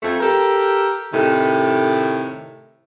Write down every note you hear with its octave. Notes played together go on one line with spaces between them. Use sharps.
F2 A3
G4 A4 A#4
A2 C3 D#3